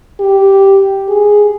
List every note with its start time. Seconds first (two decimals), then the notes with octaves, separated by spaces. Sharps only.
0.20 G4
1.09 G#4